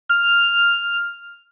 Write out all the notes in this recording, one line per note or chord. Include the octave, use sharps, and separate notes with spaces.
F6